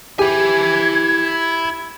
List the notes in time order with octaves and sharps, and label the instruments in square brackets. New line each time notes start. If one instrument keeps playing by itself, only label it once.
[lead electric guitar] E4 G#5 [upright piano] G4 [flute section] G#6